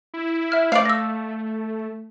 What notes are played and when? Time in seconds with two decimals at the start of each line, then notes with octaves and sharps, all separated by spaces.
0.14 E4
0.52 E5 F6
0.72 A3 D5 F5
0.85 E6 A#6